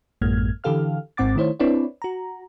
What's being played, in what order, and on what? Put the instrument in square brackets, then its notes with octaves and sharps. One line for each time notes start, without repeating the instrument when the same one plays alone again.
[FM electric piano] A1 F#2 G#3 A#3 F6 G#6
D3 E3 G4 A4 F5 F6
G#1 G#2 C4 F#5 D6 A6
D#3 A3 E4 C5 C#5
C4 D4 E4 B4 C#5 D5
F#4 A#5